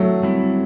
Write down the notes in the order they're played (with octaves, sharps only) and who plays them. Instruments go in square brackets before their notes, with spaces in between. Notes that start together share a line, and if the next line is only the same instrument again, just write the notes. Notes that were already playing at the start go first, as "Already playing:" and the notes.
Already playing: [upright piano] F#3 A3
[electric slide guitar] G3 C4 E4